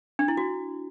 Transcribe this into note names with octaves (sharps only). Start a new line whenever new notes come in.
D4
E4
F#4